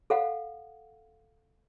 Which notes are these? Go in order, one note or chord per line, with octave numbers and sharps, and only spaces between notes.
A4 F5 F#5